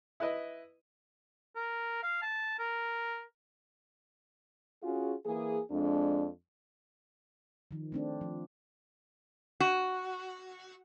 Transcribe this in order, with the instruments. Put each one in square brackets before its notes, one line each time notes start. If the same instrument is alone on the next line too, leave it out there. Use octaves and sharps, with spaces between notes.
[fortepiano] E4 B4 D#5
[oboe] A#4
F5
A5
A#4
[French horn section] C#4 F4 F#4 G#4
E3 A#3 G#4
F2 G#3 D4
[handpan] D#3 F3
A3 C4 D4
F3
[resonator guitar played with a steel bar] F#4